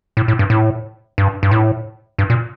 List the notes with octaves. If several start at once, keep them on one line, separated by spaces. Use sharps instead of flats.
A2
A2
G2
A2
G2
G2
A2
G2
A#2